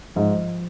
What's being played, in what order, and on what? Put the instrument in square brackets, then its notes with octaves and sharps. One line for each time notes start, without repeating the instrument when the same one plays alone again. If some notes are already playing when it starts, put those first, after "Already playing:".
[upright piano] G#2 [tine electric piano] F3